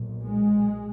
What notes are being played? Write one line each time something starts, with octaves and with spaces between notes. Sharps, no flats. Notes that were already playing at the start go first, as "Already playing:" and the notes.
Already playing: B1 A#2
G#3